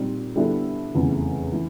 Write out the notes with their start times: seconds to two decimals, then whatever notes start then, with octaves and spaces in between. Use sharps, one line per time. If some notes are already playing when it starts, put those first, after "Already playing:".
Already playing: A#2 G3 C4 D#4
0.36 D3 G3 B3 E4 A4
0.94 F1 E2 C#3 E3
1.52 E3